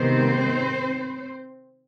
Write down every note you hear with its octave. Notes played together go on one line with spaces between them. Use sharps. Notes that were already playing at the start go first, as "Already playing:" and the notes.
Already playing: C3 D#3 G#3 B3 C4 C5